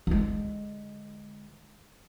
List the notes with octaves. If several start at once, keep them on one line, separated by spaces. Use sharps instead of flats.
D3 G#3